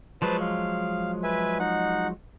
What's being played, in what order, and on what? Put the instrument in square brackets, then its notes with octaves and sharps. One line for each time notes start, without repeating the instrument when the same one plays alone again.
[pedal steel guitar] F3 F#3 G#3 [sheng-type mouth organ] B4 C5 A5
[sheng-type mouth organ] F5
B4 E5 G#5
D#4 F#5